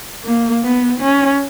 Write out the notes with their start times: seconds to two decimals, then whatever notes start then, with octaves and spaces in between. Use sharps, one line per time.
0.25 A#3
0.64 B3
1.01 C#4